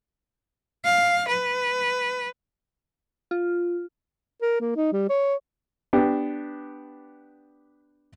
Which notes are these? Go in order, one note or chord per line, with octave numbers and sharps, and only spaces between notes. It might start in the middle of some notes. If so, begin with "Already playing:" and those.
F5
B4
F4
A#4
A#3
D#4
G3
C#5
B3 D4 G4